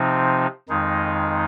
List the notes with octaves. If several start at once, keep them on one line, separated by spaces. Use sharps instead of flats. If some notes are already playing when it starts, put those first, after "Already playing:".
Already playing: C3 F3 C4 D#4
F2 D#3 G#3 D#4